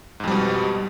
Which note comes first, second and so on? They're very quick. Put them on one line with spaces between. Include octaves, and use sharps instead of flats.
G#2 F2 G3 B2